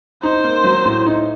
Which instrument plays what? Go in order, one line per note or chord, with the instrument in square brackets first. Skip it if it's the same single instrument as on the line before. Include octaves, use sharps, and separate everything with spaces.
[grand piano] D#4 [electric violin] C5
[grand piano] A#3
F#3
A2
D#4